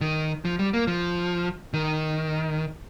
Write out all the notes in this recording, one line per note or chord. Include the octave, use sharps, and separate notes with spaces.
D#3
F3
G3
A#3
F3
D#3